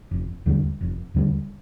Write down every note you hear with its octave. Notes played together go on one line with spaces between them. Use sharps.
F1
D#2 D3 G3
F1
D#2 D3 G3